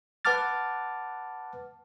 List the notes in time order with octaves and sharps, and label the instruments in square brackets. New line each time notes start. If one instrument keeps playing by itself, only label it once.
[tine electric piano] B4 F#5 A5 D6 F6 A6